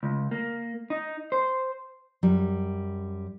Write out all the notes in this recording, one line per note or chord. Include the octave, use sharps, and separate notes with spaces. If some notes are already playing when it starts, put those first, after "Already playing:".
C#2
A#3
D#4
C5
F#2 G3